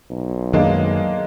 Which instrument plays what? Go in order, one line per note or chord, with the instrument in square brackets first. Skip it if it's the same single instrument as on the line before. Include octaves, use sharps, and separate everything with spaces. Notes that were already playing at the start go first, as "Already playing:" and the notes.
[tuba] B1
[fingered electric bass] F#2 D#3 F#3 [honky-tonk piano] G#3 A#3 D4